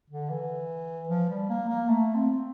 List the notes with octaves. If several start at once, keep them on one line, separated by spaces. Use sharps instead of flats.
D3
E3
F3
G3
A#3
A#3
A3
C4